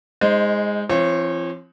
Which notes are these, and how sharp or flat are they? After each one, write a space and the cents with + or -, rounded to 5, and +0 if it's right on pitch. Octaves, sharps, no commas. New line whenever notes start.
G#3 -10 D#4 +25 C5 +0
F3 -40 C4 +15 C#5 -30